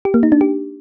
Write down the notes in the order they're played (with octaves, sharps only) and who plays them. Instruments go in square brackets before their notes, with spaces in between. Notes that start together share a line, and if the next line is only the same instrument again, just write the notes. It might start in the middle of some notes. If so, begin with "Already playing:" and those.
[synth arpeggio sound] G4
A#3
D#4
D4
G4